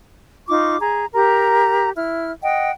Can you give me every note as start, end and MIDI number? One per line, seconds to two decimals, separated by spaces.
0.48 0.76 63
0.48 0.76 65
0.48 0.76 85
0.48 0.76 86
0.81 1.07 68
0.81 1.07 82
1.14 1.89 67
1.14 1.89 70
1.14 1.89 82
1.95 2.31 64
1.95 2.31 89
2.43 2.71 75
2.43 2.71 78
2.43 2.71 79